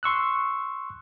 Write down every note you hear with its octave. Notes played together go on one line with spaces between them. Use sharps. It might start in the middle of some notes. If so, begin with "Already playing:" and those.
C6 C#6 E6 F#6